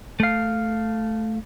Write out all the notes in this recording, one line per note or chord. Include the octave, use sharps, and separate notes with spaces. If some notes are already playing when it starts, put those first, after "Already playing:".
A3 F5